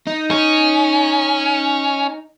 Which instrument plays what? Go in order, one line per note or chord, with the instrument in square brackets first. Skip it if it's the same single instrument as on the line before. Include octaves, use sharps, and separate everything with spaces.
[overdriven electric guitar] D#4
[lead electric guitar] C#4